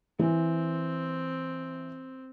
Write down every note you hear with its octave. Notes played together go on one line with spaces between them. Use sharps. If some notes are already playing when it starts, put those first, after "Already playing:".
E3 C4